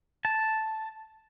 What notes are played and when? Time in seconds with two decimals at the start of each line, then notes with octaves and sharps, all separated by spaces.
0.25 A5